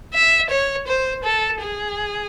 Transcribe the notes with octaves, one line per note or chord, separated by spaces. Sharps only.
E5
C#5
C5
A4
G#4